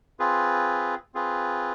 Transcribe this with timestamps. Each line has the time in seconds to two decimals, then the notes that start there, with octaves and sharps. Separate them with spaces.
0.20 C4 F4 G#4 B4
1.14 C4 F4 G#4 B4